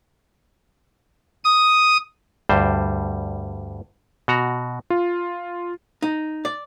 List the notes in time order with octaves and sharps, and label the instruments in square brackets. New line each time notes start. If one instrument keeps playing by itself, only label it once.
[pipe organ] D#6
[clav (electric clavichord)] D2 G2 G3 C5
B2 F#4 A#5
[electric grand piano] F4
[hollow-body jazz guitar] D#4
D5